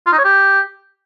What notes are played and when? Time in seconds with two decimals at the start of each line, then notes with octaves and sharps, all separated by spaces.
0.06 F4
0.12 D#4
0.18 C#5
0.24 G4